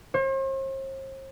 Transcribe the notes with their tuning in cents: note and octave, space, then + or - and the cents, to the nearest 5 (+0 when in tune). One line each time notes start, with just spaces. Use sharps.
C5 +45